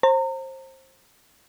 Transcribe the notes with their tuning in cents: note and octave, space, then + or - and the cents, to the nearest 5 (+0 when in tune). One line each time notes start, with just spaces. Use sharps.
C5 +25 A#5 -35